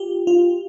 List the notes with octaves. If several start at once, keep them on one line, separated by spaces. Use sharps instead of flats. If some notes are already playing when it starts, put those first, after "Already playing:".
Already playing: F4 G4
F4